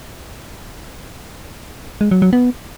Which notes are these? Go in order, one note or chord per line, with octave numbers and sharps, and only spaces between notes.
G#3
F#3
F#3
B3